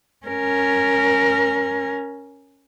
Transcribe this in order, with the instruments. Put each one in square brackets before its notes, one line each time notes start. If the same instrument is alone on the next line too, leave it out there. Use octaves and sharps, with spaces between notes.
[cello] C#4 A#4